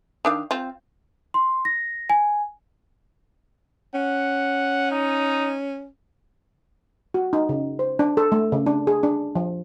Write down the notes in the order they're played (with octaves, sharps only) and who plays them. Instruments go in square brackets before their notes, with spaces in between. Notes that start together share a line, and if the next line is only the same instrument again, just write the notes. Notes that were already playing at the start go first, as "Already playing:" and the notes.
[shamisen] D#3 D4 F5
C4 F4
[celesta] C6
A#6
G#5
[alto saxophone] C#4 [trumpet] F#5
[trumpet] D#4
[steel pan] F#4
D#4
C#3
C5
D4
A4
A3
C#3
D4
G#4
D4
F3